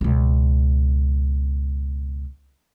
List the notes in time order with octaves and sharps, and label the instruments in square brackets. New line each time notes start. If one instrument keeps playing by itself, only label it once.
[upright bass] C#2 B2